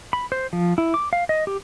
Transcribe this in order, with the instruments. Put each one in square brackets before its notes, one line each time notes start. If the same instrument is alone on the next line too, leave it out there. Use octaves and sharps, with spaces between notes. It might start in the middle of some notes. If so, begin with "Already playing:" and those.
[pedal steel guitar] B5
C5
F3
E4
D6
F5
D#5
G4